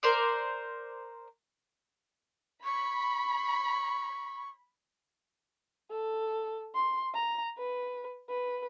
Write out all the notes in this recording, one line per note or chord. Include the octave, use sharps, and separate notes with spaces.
A#4 C5 D5
B5 C#6
A4
C6
A#5
B4
B4